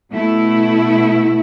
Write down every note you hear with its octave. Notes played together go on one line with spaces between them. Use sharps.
B2 A3 E4